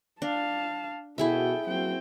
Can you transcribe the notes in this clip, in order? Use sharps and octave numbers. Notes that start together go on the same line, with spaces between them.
D4 F5 A5
B2 E4 F#4 G#4 A4 E5 G5
F#3 A#3 C4 F#4 G5